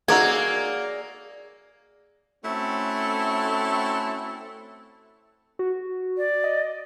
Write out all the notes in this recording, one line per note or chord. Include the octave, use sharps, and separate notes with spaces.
A#3 C#4 D#4 F#4 G#4 C#5 D5 E6
A3 C4 C#4 E4 F#4 A4
F#4
D5
D#5